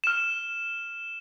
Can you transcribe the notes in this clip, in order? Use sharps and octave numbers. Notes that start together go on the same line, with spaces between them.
F6 E7